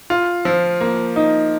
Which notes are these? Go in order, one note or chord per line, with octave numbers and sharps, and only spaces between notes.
F4
F3
A#3
D#4